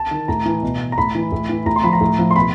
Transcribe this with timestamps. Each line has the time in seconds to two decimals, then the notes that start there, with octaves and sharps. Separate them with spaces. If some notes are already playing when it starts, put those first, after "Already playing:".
Already playing: A5
0.11 D#3
0.28 A2 A#5
0.46 E3
0.63 B2
0.92 A#5
0.98 A2 B5
1.15 E3
1.32 A2
1.49 E3
1.66 A2 A#5
1.76 C6
1.84 F3 B5
1.93 A#5
2.01 A2
2.19 F3
2.31 C6
2.36 B2 B5